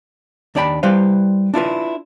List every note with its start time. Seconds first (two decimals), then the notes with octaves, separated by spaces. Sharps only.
0.55 D#2 D4 D5 G5 G#5 B5
0.83 G3 E4 B4 C5 F5
1.54 D4 E4 F4 B4